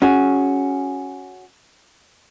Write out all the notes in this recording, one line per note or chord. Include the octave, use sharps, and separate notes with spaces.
C#4 F#4 G#4